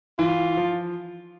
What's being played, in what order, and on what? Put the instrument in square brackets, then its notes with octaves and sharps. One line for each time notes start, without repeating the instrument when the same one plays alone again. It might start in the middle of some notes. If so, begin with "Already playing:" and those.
[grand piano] E3 [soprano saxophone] F4
[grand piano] F3